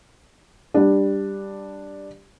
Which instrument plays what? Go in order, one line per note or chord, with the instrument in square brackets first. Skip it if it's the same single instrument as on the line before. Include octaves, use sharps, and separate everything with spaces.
[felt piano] G3 D4